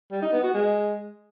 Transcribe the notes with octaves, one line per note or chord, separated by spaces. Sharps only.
G3
D#4
B3
F#4
G#3